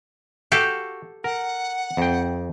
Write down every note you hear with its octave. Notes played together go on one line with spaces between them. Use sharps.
F#4 G4 A4 F5
A#4 F#5
F2 G5